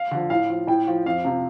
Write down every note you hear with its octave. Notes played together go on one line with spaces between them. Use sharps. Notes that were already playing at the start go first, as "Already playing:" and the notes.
Already playing: F5
D3 F3
A2 F5
F3
A2 G5
F3
F2 F5
C3 F3